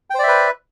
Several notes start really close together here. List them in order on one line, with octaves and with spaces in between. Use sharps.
G5 C5 D5 E5 B4